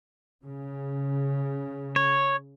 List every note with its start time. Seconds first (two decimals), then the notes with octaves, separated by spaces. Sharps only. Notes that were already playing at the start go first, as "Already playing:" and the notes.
0.45 C#3
1.96 C#5